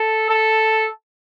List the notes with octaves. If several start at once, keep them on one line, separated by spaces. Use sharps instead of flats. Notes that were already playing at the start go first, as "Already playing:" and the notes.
Already playing: A4
A4